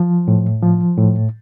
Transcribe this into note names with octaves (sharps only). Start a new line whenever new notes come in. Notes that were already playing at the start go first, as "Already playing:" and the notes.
Already playing: F3
A2
F3
A2